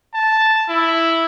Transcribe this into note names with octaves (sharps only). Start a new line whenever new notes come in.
A5
E4